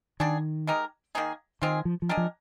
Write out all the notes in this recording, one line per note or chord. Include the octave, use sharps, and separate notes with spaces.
D3 D#3 G3 D4 G#4
G#3 D#4 G4 A#4
D#3 A#3 D#4 G#4
D#3 G#3 C4 F4 G#4
F3
F3
G#3 D4 G4 A#4
F3